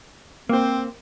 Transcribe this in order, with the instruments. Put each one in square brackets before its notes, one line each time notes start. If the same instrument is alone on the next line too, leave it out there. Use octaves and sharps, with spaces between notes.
[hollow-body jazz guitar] A#3 C5 [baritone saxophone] C4